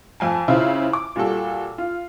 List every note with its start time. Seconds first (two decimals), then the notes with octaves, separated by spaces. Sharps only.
0.20 F2 G#5 A5
0.48 C#3 E4 F4 C5
0.93 D6
1.16 A#2 G3 F#4 A4
1.78 F4